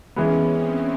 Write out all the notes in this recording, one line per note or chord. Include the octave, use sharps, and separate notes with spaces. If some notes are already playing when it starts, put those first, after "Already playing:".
E3 G#3 B3 C#4
C4